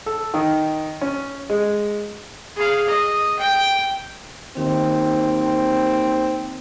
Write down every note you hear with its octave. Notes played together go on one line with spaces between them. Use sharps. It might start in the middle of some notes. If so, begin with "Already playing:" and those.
A4
D#3
C#4
G#3
G#4 F5
D#5
G5
D#2 D#3 C4